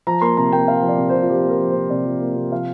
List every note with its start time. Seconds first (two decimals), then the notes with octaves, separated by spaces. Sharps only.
0.07 F3 A#5
0.22 A#3 C6
0.37 C3 A#5
0.52 A#3 G5
0.67 A#3 F5
0.82 F3
0.89 D5
0.98 C3
1.09 C3 C5
1.22 F4
1.29 F3 G4
1.45 A#3 A#4
1.60 F3
1.71 C3 C5
1.90 C3 D5
2.05 F3
2.21 A#3
2.36 C3
2.51 F3 F5